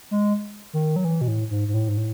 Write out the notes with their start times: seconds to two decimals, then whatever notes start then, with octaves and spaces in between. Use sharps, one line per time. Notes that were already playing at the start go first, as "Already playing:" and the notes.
0.11 G#3
0.73 D#3
0.96 F#3
1.05 E3
1.21 B2
1.28 A2
1.50 G#2
1.68 G#2
1.74 A2
1.88 G#2
1.97 A2